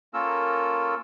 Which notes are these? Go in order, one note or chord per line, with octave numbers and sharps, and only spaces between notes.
A#3 C#4 F4 A4 A#4 E6